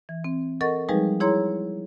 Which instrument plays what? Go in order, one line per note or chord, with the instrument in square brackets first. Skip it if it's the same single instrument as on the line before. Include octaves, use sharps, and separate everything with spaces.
[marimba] E3
C4
A4 A#4 D#5 F#5 C#6 A6
F3 G3 G#3 D#4 G#4 B4
E4 G#4 C#5 A#5 C6